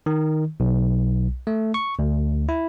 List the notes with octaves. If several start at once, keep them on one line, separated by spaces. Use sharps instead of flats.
D#3
B1
A3
C#6
D2
E4